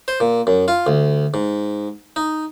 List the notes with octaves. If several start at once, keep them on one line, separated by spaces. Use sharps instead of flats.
C5
A#2
F#2
F4
D2
G#2
D#4